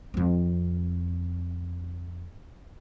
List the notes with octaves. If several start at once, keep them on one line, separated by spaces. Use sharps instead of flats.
F2 C4